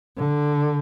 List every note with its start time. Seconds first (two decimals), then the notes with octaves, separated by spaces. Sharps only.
0.17 D3